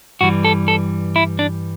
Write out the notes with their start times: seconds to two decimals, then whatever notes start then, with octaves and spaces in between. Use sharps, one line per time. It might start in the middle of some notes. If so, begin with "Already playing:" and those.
0.21 G2 E3 G3 F#4
0.45 A4
0.68 A4
1.16 E4
1.39 D4